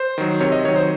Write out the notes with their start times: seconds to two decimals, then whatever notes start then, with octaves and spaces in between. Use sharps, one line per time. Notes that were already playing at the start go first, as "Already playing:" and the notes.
Already playing: C5
0.18 D#3 F#3
0.40 C3 C#5
0.52 D#5
0.64 D#3 F#3 C#5
0.76 C5